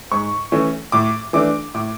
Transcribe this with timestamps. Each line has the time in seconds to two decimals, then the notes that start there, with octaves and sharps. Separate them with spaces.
0.11 G#2 C#6
0.52 E3 A3 C#4
0.92 A2 D6
1.33 E3 A3 D4 D6
1.74 A2 D6